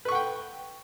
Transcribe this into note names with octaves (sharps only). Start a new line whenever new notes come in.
B4 F#5 G5 C#6